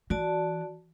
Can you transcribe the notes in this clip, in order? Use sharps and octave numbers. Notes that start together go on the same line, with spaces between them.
E3 F#4 D5 A5